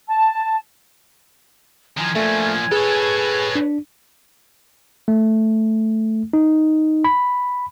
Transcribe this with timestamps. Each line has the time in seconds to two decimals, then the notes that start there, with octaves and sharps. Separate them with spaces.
0.07 A5
1.97 D#3 F3 G#5 G#6
2.15 A#2 F3 A3
2.72 G#4 A4 B4 C#5
3.55 D4
5.08 A3
6.33 D#4
7.04 B5